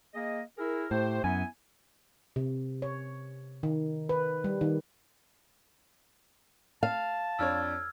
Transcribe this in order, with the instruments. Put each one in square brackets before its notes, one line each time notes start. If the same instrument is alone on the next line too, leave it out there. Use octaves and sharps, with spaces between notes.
[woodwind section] A#3 G#4 D#5
E4 G#4 A#4
[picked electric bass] A2 [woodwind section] A3 G4 C5
[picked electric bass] F#2 [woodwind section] B3 E4 G#5
[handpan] C3
C#5
D#3
B4
G3
D#3
[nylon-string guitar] F5 [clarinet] A5
[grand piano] F2 D4 C#5 [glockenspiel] E6 F6 G#6